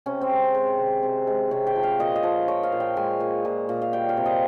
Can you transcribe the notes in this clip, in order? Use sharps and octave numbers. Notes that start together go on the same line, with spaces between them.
C3 C#4
C4
G#3
G#3 C5
C3
C3
G#3
C3 C#5
G5
F3
F5
A#2 D#5
D#5
F3
F3 C#5
F5
A#2
G5
G#3 G#5
A#2
A#2
A#2
F5
G3 G5
F5
C3
D#5